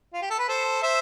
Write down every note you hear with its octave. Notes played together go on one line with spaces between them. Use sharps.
F4
G4
A4
B4
A4 C5
C5 E5